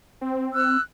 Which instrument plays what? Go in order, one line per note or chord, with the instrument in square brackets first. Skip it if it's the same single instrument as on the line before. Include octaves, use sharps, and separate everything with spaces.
[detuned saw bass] C4
[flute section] E6 F#6